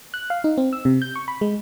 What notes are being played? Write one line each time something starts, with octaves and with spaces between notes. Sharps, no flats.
F#6
F5
D#4
C4
E6
C3
G6
C#6
B5
G#3